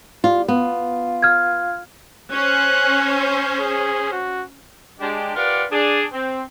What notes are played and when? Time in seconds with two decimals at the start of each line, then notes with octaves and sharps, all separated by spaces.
0.24 G3 F4
0.48 B3 F4
1.23 F6 G#6
2.32 C#4 C5 F#6
3.60 G#4
4.12 F#4
5.00 G#3 D4 G4
5.36 F4 G4 A#4 B4 D5 F#5
5.71 D4 G#4
6.12 C4